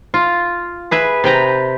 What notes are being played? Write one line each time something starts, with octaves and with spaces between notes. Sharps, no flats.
F4
G#4 B4 E5
C3 B4 G5 A#5